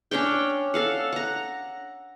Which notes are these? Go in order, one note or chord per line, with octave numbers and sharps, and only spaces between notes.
C#4 D4 C#5 G5
A4 F5 F#5
F#5 A#5